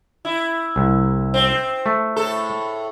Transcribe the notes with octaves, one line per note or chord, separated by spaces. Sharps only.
E4
C2
C4
A3
A2 A4